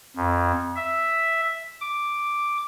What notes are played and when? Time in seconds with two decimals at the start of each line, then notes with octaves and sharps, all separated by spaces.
0.16 F2
0.76 E5
1.81 D6